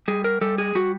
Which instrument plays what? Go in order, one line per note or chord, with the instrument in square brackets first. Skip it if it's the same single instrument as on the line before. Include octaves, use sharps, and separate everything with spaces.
[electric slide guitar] G3 G#4
A#4
G3 A4
G#4
G3 F#4